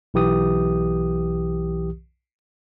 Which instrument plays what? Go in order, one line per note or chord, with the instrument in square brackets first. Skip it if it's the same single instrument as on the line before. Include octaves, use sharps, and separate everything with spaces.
[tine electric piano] B1 E3 G4 D#6